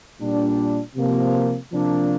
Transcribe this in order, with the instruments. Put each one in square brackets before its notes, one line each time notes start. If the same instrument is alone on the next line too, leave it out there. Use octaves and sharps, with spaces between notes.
[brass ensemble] A#2 G3 D4
C3 F3 A#3
C3 F3 A#3 D4